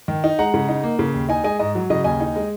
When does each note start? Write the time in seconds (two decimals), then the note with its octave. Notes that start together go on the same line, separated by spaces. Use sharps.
0.08 D#3
0.24 D#4
0.39 G#3 F#5 A#5
0.54 C#3
0.69 D#4
0.84 A#3
0.99 C#3
1.14 D#2
1.29 D#4 D#5 G#5
1.44 G#3 D#5 G#5
1.59 G#2 D#5
1.75 F#3
1.90 C#3 D#5
2.04 D#2 D#5 G#5
2.20 D#4
2.36 G#3